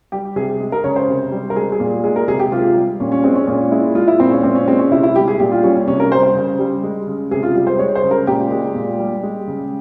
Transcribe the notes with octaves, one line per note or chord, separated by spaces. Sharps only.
G3 G4
C3 G#4
G#3
A#4
C#3 C#5
C5
C3
G3
A#4
G#3 G#4
G#4
A#2
G#3 G#4
A#4
C3 G#4
G4
C3 F4
G3
A#2 C#4
C#4
G#3 C4
C#4
A#2 C#4
G#3 E4
G#3 F4
E4
A#2 C4
C#4
A#2 C4
C#4
G#3 C4
C#4
C3 E4
E4
G3 G4
G#4
A#2 G4
F4
G3 C#4
C#4
C3 C#4
A#4
G3 C5
C5
C#3
G3
G#3
C#3
C3 G#4
F4
G3
C5
G#3 C#5
C5
C#3
A#4
A#2 G4
G#3
A#2
G3
G#3
C#3